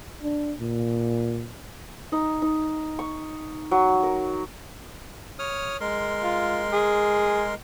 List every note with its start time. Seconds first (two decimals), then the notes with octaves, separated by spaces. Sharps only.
0.23 D4
0.60 A#2
2.12 D#4
2.42 D#4
2.99 C#6
3.71 F#3
4.03 A#4
5.39 C#5 D#6 F6
5.81 G#3 A#4 C6
6.23 F4
6.72 G#4